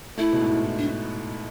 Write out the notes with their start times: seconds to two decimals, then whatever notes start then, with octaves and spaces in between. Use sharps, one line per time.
0.18 A3 E4
0.33 B2
0.41 G#2
0.48 A2
0.78 D4